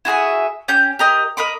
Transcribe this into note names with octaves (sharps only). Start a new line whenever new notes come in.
E4 F#4 G#4 E5
C#4 G4 G6
G4 A#4 D#5
A#4 D#5 B5 D6